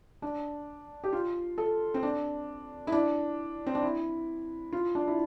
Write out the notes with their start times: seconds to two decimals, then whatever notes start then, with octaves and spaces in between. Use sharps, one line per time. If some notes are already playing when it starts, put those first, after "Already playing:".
0.22 D4
1.04 G4
1.13 F4
1.58 A4
1.94 C4
2.03 D4
2.87 E4
2.92 D4
3.67 C4
3.75 D4
3.82 E4
4.73 F4
4.95 D4
5.07 E4